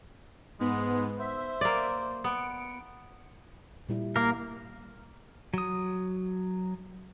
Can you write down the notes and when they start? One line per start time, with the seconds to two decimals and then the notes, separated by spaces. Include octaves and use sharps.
0.60 G#2 G#3 B3
1.19 C5 E5
1.61 A#3 D5
2.24 B3 C#7 D7
3.89 A#2 G3 E4
4.16 A#3 A#4
5.54 F#3 D#6